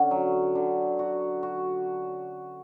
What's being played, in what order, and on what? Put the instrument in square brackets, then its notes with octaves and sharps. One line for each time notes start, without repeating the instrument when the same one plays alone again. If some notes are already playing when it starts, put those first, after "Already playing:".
Already playing: [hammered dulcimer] D3 C#4 [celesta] F#5
[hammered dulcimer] F#3
D3
F#4
F#4